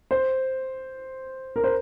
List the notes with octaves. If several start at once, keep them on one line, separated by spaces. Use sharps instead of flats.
C5
A#4
C5